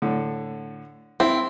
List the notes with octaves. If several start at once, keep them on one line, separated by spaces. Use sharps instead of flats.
A2 D3
C4 E4